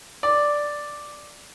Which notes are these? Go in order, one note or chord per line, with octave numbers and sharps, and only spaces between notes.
D5